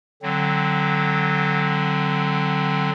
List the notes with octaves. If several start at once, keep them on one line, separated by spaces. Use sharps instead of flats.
D3 F#3 C4